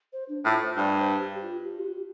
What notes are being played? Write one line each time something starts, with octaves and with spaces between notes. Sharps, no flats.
C5
D4
A2 F4
C5
G2 D5
C5
G4
F4
G4
F4
G4